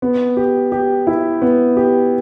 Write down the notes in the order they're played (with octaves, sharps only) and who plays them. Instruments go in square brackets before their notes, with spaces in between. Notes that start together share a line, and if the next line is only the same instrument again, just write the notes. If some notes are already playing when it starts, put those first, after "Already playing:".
[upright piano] B3
G4
G4
E4
B3
G4